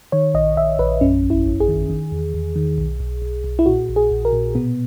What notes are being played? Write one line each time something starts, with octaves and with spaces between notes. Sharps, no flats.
D#3 C#5
A#1 D#5
A#1 E5
A#1 B4
F#2 C#4
G#1
E4
G#1
G#4
D#3
D#3
E2
E2
D#3
B1
B1
B1
B1
E4
A#2 F#4
A#1
G#4
A#1
A#4
A#2
B2 B3